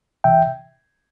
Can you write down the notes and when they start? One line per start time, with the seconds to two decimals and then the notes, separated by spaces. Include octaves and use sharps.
0.24 C2 C3 E3 E5 G5